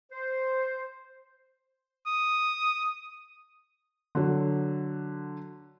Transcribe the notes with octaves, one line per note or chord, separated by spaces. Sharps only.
C5
D#6
D3 F#3